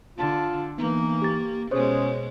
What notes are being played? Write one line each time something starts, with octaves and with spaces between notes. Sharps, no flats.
D3 F4 A5
E3 A#3 B3 D#4
G4 A6
B2 G#3 C#4 G#4 C5 C#5